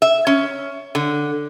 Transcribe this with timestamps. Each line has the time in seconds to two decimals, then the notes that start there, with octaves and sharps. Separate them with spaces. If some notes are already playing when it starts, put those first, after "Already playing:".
0.02 E5
0.27 C#4
0.95 D3